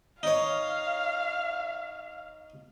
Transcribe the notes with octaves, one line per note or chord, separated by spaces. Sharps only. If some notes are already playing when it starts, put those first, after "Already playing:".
D#4 C#5 F5